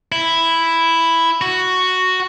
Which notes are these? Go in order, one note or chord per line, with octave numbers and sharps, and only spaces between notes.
E4
F#4